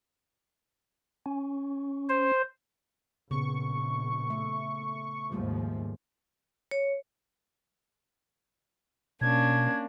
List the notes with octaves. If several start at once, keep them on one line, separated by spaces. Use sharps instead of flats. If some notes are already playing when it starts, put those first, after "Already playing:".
C#4
C5
A#1 C#3 B3 C#6
A3 E5
D#2 G#2 F3 G3 A3 A#3
C#5
B2 A#3 C#4 D4 G#6